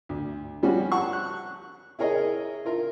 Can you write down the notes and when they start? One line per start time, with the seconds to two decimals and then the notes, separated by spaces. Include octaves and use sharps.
0.09 D2
0.63 F3 G3 C#4 F#4
0.92 F#5 A5 C#6
1.13 F#6
1.99 E4 G#4 A#4 C#5 D#5
2.65 E4 F4 A#4